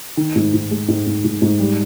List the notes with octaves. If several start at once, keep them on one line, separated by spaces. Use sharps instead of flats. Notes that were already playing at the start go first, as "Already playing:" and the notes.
D#3
G#2
G#2
G#3
G#2
G#2
G#2
G#2
G3